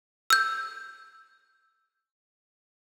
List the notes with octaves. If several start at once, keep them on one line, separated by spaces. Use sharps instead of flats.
E6 G6